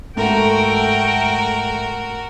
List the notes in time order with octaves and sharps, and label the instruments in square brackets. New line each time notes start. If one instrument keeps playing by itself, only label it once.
[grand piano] G#2 [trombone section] A3 [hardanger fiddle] F#4 A#4 [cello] G5